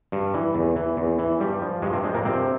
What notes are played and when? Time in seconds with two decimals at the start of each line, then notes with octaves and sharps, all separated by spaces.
0.12 G2
0.34 E3
0.55 E2
0.76 E3
0.97 E2
1.19 E3
1.40 G2 G3
1.62 F3
1.82 G2 G#3
1.93 C3 C4
2.04 F3 G#3
2.14 A#2 A#3
2.25 G2 C3 C4